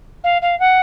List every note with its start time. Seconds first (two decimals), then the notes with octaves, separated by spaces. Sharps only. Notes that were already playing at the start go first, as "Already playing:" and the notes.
0.24 F5
0.42 F5
0.60 F#5